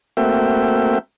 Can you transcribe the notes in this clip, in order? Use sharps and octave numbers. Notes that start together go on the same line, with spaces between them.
A3 A#3 C4 F#4 E5 G5